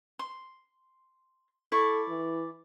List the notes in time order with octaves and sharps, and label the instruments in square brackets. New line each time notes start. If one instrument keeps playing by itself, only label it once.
[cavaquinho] C6
[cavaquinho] E4 D5 C#6 [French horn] A4
[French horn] E3